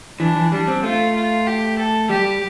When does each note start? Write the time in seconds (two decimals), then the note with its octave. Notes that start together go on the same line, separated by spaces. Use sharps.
0.20 E3 D4
0.36 E3
0.52 G3 D4
0.68 C4
0.83 A3 F4
1.15 F4
1.47 G4
1.78 A4
2.10 G3 G4